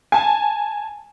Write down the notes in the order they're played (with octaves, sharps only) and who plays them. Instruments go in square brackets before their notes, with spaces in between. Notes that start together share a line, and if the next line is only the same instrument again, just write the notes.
[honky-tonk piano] G#5 A5